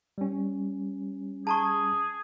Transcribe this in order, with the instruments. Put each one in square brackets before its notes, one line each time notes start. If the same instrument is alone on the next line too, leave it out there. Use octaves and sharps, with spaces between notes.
[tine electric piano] G3 C#4
[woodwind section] G#4 [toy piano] A5 A#5 C#6